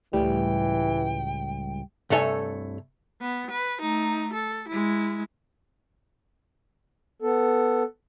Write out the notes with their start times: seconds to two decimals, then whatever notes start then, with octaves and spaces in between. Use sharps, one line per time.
0.13 C#2 A2 E3 G3 G5
2.10 C2 G2 A3 A4 C#5 G#5
3.21 B3
3.51 B4
3.81 A3 D#4
4.33 A4
4.68 G#3 E4
7.22 B3 A4